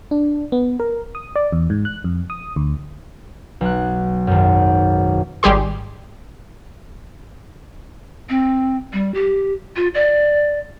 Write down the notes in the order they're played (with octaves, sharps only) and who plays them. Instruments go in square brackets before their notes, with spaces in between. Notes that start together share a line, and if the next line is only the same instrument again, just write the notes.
[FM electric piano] D4
B3
A#4
D#6
D5
E2
G#2
F#6
F2
D#6
D2
[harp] B1 F#6
G#1 F#2
[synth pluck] G#1 G3 G4 G#4 C6
[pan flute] C4
G3
G4
F4
D5